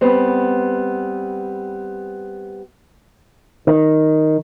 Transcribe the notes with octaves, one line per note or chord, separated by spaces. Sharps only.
G3 B3 C4
D#3